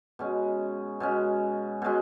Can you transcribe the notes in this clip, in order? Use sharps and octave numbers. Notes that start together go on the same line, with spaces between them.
B2 G#3 C#4
B2 G#3 C#4
B2 G#3 C#4